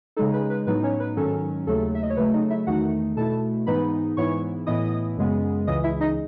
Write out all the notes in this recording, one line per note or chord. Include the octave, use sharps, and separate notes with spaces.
C#3 G#3 D#4 A4
B4
B4
A2 F#3 B3 D#4 B4
C#4 C#5
B4
G#2 D#3 F#3 C#4 A4
D#2 C#3 F#3 A3 A4
E5
D#5
C#5
C#3 F#3 A3 B4
D#4 D#5
E4 E5
E2 D#3 A3 D#4 F#4 F#5
B2 A3 E4 A4 A5
G#2 E3 B3 D#4 B4 B5
G#2 E3 B3 E4 C#5 C#6
A2 E3 B3 E4 D#5 D#6
F#2 C#3 G#3 B3
C#2 C#3 E3 D#5 D#6
E4 E5
D#4 D#5